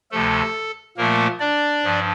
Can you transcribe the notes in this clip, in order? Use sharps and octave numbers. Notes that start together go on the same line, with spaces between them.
D2 C3 F3 A3 A4
A#2 F3 A3 A#3 A#4
D4 D5
G2 F3